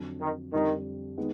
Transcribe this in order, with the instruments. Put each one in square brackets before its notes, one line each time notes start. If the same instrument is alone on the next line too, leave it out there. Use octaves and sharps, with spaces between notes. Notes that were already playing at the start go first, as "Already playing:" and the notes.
Already playing: [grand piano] F2 D3 F#3
[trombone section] D#3
[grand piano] F2 D3 G3 [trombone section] D#3
[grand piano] D#3 G#3 B3